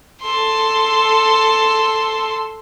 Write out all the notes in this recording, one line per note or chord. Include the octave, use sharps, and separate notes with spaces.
A4 C6